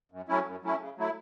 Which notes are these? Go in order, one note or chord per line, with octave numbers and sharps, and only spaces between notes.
F#2
F#3 A3 C#4 E4
F#2
F#3 A3 C#4 E4
C#3
F#3 A3 E4